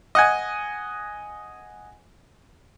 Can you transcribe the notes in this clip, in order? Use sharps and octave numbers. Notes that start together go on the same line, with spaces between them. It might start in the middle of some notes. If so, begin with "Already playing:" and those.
D#5 F#5 G#5